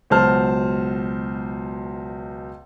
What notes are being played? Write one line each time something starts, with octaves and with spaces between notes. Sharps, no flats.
C#2 B2 F#3 C5 A5 F6